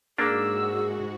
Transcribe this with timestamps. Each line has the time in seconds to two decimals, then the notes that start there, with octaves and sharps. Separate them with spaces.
0.18 G#2 A#3 D4 F#4 G#4 E6